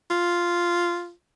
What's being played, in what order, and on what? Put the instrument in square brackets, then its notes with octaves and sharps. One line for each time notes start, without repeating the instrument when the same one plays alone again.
[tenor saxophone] F4